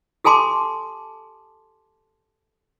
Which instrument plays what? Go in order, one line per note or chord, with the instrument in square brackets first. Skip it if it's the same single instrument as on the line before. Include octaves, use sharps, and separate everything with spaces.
[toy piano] G4 A4 G#5 A5 C6 D6